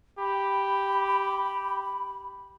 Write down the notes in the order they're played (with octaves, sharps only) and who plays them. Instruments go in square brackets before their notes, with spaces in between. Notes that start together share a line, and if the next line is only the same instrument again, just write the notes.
[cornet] G4 [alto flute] B5